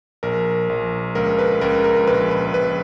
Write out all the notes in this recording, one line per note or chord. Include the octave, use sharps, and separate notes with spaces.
A#1 A#4
A#1
C#2 A#4
B4
C#2 A#4
A#4
A#1 B4
B4
A#1 B4